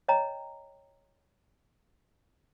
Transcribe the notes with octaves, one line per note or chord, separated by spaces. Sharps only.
C#5 D#5 G5 A#5